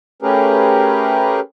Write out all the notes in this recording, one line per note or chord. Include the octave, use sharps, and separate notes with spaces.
A3 C#4 G4 G#4 A#4 B4